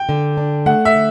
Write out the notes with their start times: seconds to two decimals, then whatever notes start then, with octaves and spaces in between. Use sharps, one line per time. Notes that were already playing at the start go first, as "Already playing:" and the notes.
Already playing: G5
0.09 D3
0.37 D4
0.66 A3 F#5
0.85 E5
0.95 D3